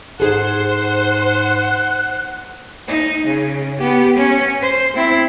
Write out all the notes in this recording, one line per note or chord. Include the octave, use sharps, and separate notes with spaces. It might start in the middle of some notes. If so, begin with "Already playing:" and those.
G#2 D#4 G#4 A4 C5 F#5
D#4
C#3
B3 G4
C#4
C5
C4 E4